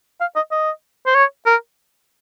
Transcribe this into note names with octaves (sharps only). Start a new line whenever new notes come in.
F5
D#5
D#5
C5
C#5
A#4